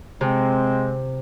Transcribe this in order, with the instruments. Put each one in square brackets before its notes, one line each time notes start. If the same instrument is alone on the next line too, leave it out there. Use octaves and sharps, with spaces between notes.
[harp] C3 [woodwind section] G#3 C4